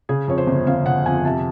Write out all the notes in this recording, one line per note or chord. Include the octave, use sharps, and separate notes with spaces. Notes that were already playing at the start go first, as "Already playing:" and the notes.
C#3 G#4
F2 C#5
C5
G1
G1 F5
C#3 F#5
F2 G#5
C3 A5